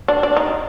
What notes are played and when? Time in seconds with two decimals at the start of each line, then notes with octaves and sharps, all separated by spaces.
0.08 D4
0.23 D4
0.37 D#4